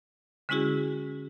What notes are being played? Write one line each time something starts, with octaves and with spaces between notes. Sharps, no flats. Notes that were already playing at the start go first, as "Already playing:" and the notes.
D3 G#3 C#4 E4 F#4 G#4